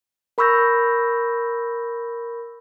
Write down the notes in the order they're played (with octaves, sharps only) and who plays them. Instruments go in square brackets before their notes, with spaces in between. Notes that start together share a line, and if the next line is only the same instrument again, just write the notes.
[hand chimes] A#4 B5 C#6 E6 G6 A#6